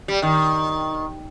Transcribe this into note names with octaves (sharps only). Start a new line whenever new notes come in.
G3
D#3